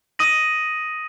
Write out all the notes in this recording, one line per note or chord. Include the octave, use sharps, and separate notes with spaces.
D#6 A#6 D#7 F#7